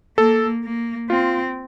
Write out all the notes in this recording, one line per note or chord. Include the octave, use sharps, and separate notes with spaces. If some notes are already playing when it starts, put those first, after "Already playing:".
A#3 A4
A#3
C4 F4